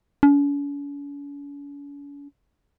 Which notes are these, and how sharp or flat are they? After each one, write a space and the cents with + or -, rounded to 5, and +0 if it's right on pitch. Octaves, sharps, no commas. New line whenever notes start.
C#4 +45